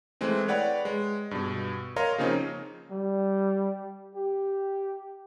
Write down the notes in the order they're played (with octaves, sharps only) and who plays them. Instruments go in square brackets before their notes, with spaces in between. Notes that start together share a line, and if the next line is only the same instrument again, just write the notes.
[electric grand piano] E3 G#3 A3 C4
B4 C#5 D5 F#5 G5 B5
G#3
G2 B2
A#4 C#5 D#5 F5 A#5 C6
C#3 F3 A#3 C4 C#4 D#4
[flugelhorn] G3
G4